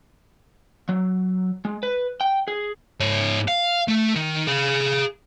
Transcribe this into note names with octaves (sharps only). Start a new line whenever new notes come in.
F#3
G#3
B4
G5
G#4
G#2 C#5
F5
A3
D#3
G#4 F5